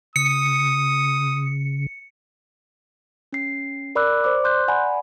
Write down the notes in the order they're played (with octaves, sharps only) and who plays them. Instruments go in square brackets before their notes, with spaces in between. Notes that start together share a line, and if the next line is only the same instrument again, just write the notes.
[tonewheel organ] C#3 [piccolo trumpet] D#6 [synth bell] C#7
[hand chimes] C#4 C7
A#4 D5 B5 D6 E6 F#6
C5 D5 D6
C6 F#6 G6
D5 F#5 G#5 A#5 B5